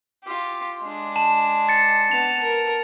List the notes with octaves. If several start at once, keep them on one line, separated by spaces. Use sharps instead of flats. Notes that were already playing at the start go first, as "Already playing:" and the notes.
F4 G4
G#3 D4
A5 E7
A6 C#7
B3 A5 F7
A#4